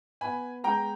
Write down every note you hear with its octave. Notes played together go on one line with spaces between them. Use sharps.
B3 G#5 B5
G#3 G5 A#5